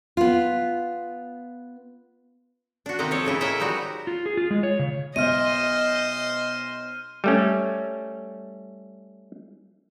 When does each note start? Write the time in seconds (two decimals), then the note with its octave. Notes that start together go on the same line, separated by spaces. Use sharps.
0.17 B3 F4
2.86 D4 F#4
2.99 C3 D#3 A#3 C4 G4 D#5
3.11 F3 A4 C#5
3.25 A2 C#3 E4 D#5
3.41 A#4 C#5 D#5 E5 F#5
3.60 F3 G3 D#4 F#4
4.07 F4
4.26 G#4
4.37 F4
4.51 G#3
4.63 C#5
4.79 C#3
5.16 B1 C5 D#5 E5 F6 D#7
7.24 G3 A3 C#4